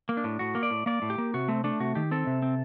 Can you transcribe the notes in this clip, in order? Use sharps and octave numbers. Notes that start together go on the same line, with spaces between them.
A#3
D4
A2
A2 F#4
A#3
D5
A2
A#3 D5
A2
G4
A#3
C3 F#4
A3 C4
A3 D4
C3 F#4
D#3 G4
C4 A4
C3
C4